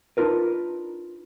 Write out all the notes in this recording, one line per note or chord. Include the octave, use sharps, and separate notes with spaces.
D4 D#4 F4 A#4 B4